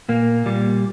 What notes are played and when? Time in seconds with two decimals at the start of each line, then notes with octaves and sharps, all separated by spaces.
0.09 A#2 A#3
0.46 A#2 G3